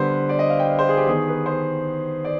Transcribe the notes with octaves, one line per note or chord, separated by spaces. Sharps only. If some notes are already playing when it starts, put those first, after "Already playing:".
Already playing: D3 G3 B3 B4 C5
D5
D#5
F5
G5
F5
C5
G#4
G4
D#3 B3 G#4
B4
C5
D5